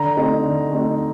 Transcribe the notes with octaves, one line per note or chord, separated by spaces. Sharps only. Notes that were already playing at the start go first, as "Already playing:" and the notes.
Already playing: D3 A#5
A3 C4 D#4
D3
A3 C4 D#4